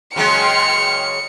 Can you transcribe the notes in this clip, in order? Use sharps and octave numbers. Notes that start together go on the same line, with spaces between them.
C#3 F#3 G#3 G5 C6 F6 C#7